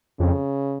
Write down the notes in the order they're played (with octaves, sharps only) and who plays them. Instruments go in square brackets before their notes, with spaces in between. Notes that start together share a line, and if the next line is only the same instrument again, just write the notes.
[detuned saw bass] F2 [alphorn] C#3